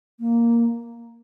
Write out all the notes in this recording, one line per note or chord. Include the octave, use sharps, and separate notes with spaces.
A#3